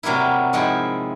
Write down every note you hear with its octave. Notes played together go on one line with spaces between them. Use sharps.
C3 F#3 G3 A#3 E4
G#2 F3 G#3 E4 G5